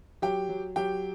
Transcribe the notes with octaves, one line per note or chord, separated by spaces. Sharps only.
F#3 G4 G5
F#3
F#3 G4 G5